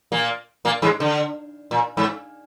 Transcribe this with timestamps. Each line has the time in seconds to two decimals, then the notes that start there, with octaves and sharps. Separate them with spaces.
0.12 A#2 A#3
0.65 A#2 A#3
0.82 G#2 G#3
1.00 D3
1.71 A#2
1.97 G#2